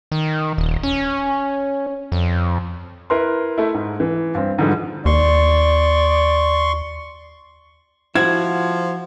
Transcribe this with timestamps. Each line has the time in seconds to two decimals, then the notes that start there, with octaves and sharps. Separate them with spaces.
0.11 D#3
0.58 D#1
0.83 C#4
2.12 F2
3.10 E4 A#4 B4 C6
3.58 A3 E4
3.74 G#2
4.00 E3
4.35 G2 C4
4.58 G#2 D3 E3 F3 G3
5.06 D#2 D5 C6 C#6
8.15 F3 E4 F#4 G#6